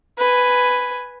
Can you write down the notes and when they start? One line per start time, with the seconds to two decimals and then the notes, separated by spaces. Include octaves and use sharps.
0.18 B4 G#5